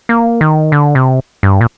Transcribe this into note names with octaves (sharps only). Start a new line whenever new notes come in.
A#3
D#3
D3
C3
G2
A#2